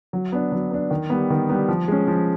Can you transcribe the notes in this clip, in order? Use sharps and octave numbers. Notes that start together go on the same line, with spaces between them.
F#3
B3 D4
F#3
B3 D4
D#3
G3 B3
D#3
G3 B3
F3
G#3 C#4
F3